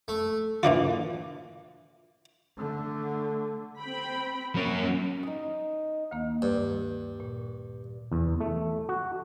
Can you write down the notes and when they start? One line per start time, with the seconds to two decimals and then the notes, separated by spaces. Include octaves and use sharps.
0.08 A3
0.63 A#2 E3 D4 F4
2.57 D3 A3
3.81 C4 G5 B5
4.55 F#3 A#3 C#4 A#4
5.23 D#4 D#6
6.11 D2 D#3 A#3
6.42 G2
7.20 A#2
8.12 E2
8.41 A3
8.89 F#4